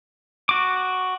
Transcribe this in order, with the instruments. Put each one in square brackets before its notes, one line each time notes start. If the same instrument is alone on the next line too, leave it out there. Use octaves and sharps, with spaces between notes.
[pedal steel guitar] F#4 D6